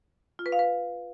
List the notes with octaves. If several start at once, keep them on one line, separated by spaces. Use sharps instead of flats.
F4
B4
F5
B4